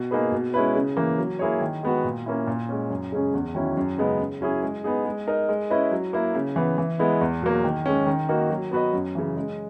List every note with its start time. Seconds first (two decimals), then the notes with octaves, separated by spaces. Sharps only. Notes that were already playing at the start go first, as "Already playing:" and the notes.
Already playing: B2
0.11 A#3 D#4 G#4 B4
0.32 B2
0.54 G#3 C#4 E4 B4
0.75 C#3
0.97 E3 A#3
1.18 F#3
1.39 A#3 E4 G#4 C#5
1.61 D#3
1.83 G#3 B3 F#4
2.04 A#2
2.26 A#3 C#4 E4
2.47 A#2
2.69 G#3 C#4
2.90 F#2
3.12 C#3 G#3 C#4 G#4
3.34 E2
3.55 D#3 F#3 C#4 E4
3.77 F#2
3.98 C#3 G#3 B3 D#4
4.19 C#3
4.41 F#3 C#4 E4 G#4
4.63 G#3
4.84 B3 D#4 G#4
5.05 G#3
5.27 D#4 A#4 D#5
5.49 G#3
5.70 C#4 E4 B4 D#5
5.92 F#3
6.13 A#3 E4
6.35 C#3
6.56 E3 B3
6.78 E3
6.99 G#3 B3 E4
7.21 E2
7.42 B2 F#3 A#3
7.64 D#3
7.86 G#3 C#4
8.07 D#3
8.29 A#3 D#4 F#4 A#4
8.50 F#3
8.71 B3 F#4 B4 D#5
8.93 F#2
9.15 C#3 E3
9.37 G#3